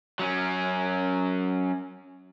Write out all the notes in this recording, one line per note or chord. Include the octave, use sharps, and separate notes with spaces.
F#3 C#4